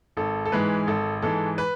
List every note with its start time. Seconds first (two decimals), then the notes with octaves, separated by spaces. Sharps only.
0.17 G#1 A4
0.46 A4
0.52 G#2 E3 G#3 B4
0.87 G#1 A4
1.22 G#2 E3 G#3 A4
1.58 B4